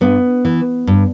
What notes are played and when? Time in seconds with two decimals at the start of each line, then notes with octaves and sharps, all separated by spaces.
0.01 G2 B3
0.45 E3
0.87 G2